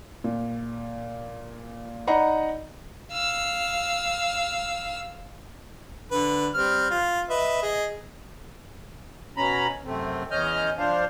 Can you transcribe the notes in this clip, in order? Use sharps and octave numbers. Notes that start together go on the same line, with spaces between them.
A#2
D#4 D5 D#5 F#5 A#5 B5
F5 E6
D3 B4
G3 C4 F6
F4
B4 D#5 E5
G#4 D#5
B2 C#4 A#5 B5
F#2 C3 A3 C4
E2 C#4 D#5 F6 G6
F3 D4 C5 F5